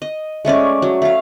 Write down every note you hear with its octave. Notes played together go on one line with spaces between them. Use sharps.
D#5
G#3 A3 C#4 D5
F#3
A3 F5